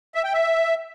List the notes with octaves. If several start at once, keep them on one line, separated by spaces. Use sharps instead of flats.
E5
G5
E5